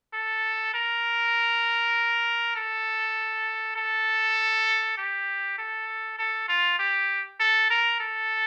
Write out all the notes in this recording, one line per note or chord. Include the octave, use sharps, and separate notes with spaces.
A4
A#4
A4
A4
G4
A4
A4
F4
G4
A4
A#4
A4